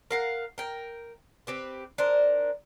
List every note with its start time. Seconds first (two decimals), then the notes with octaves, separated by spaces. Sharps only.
0.11 A#4 F5 F#5
0.58 A#4 G5
1.47 C4 G4 B4
1.98 D4 A#4 C5